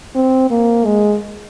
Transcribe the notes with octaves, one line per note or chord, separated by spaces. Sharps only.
C4
A#3
G#3